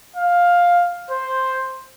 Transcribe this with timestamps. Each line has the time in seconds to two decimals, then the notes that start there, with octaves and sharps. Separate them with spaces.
0.16 F5
1.10 C5